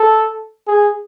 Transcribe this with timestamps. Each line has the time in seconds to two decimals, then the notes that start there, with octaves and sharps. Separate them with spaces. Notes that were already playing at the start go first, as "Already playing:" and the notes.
Already playing: A4
0.67 G#4